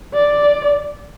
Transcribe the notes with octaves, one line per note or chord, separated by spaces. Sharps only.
D5